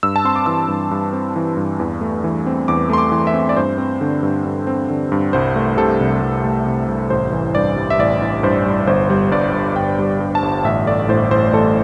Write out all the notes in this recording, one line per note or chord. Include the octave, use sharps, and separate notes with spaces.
G2 E6
A5
C4 C6
D6
E3 E6
G2
G2
C4
E3
G2
E2
A3
E3
C4
E2 D6
A3 C6
D6
E3
E5
C4
D5
G2 C5
C4
D3
G2
G2
C4
D3
G2
C2 C5
A3
C3 A4
C2
C2
A3
C3
C2
A1 C5
E3
G2 D5
G3
E5
A1 D5
E3
G2 C5
G3
G1 C5
G3
G2 D5
G1
G1 G5
G3
G2
A5
G1
A1 E5
A3 D5
A2 C5
A1 C5
A1 A4